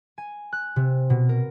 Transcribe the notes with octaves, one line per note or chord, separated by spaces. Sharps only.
G#5
F#6
C3
B2
A#4